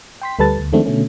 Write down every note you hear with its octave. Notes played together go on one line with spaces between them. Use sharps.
G5 C6 B6
D2 G3 A4 B4 A5 A6
D2
D#3 F3 G#3 A3 C4 D4
B2 D3 A3 C#4